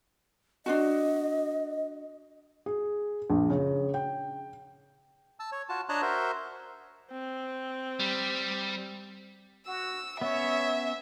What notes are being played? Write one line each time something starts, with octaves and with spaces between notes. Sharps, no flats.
D4 F4 F#4 D#5
G#4
A#1
C#3
G5
A5 E6
C#5
F4 F#4 A5
D4 C#5 D#5 A5 A#5 F#6
F#4 A#4 C5 E5
C4
G3
F#4 E6
B3 C#4 C#5 E5